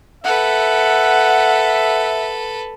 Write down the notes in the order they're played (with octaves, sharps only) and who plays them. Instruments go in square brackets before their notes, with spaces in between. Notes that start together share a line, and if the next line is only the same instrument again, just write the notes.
[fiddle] A4 B4 [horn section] E5 [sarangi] F#5